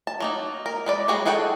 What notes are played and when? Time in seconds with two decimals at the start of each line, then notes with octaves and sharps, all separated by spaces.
0.07 A5
0.20 F#3 A#3 D#4
0.66 A#4
0.86 G#3 B4 D5
1.08 G3 G#3 F#4 G#4 C#5
1.25 F4 G#4 A4 F#5 G5